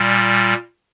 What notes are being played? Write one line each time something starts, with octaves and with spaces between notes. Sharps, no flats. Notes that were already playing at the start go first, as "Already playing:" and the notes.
Already playing: A#2 G3